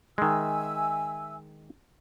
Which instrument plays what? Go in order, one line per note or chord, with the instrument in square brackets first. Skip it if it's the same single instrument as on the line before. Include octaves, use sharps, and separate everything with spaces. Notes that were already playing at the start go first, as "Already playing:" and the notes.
[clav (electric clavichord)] D#3 G#3 [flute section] E5 G#5 E6